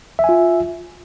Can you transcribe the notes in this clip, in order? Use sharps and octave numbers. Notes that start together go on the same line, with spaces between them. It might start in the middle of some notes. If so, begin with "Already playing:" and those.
F4 E5 G#5